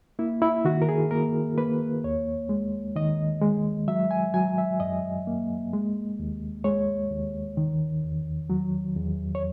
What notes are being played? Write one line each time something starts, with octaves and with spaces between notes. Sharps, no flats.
A#3 E4
E4
D#3 F#4
A#4
G#4
A#3 A#4
A#3 B4
D#2 C#5
G#3
D#3 D#5
G#3
F#3 E5
G#5
F#3 G#5
E5
F#2 D#5
A#3
G#3
D#2
G#3 C#5
D#2
D#3
E2
F#3
E2
C#5